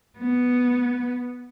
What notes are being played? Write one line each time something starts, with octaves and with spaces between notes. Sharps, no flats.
B3